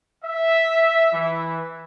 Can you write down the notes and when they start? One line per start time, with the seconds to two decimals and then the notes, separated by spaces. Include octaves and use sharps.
0.23 E5
1.13 E3